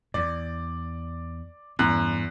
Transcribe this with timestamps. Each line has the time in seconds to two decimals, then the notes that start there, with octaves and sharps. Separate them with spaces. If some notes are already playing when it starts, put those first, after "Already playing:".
0.14 E2 D5
1.79 E2 G2 C#4 F#6